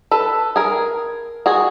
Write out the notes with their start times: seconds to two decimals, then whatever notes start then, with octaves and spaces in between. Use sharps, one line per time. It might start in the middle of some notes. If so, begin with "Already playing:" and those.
0.11 A4 B4
0.56 G#4 A#4
1.46 F#4 G#4